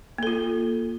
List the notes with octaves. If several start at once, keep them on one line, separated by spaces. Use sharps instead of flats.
A#3 F4 A4